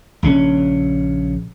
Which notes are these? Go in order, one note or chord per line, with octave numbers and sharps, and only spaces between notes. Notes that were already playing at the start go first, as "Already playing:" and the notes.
A#1 C#3 C#4